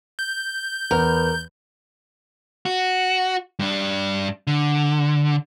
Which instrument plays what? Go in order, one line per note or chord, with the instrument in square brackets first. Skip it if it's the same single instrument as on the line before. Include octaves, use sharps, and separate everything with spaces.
[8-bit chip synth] G6
[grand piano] E2 B3 [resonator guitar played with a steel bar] A#4
[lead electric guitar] F#4
G2 D4
D3